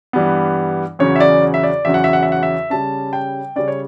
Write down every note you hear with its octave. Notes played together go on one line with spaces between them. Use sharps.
G2 E3 G3 B3
E2 C#3 F#3 C#4 C#5
E5
D5
E5
D5
E2 C#3 F#3 C#4 E5
F#5
E5
F#5
E5
F#5
E5
C#3 G3 C#4 A5
G5
C#3 G3 C#4 D5
C#5